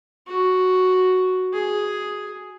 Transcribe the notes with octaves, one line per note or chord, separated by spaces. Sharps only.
F#4
G#4